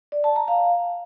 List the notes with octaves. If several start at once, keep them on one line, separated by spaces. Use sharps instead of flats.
D5
A5
A#5
F5